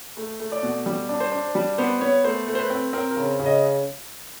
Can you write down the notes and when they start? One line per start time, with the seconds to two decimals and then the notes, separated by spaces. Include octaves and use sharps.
0.17 A3
0.40 A3
0.52 D5
0.63 B2
0.86 G3
1.09 D4
1.20 C5
1.32 D4
1.55 G3
1.78 B3 C5
2.01 B3 C#5
2.24 A3 C5
2.48 A3
2.55 C5
2.59 B4
2.70 C4
2.93 C4 A#4
3.11 A#4
3.16 C#3
3.39 C#3
3.46 D#5